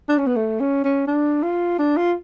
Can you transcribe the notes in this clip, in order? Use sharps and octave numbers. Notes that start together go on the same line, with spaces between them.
D4
C#4
B3
A3
C#4
C#4
D4
F4
D4
F4